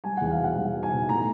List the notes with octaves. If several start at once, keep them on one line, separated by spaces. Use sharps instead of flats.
G3 G#5
E2 F#5
F5
B2 F#5
G3
B2
G#5
B2
A2 A#5